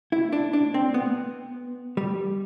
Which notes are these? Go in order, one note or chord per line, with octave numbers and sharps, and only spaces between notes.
E4
D4
D4
C4
B3
G3